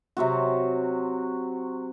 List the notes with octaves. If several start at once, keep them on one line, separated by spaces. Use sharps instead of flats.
C3 F#3 C4 F#4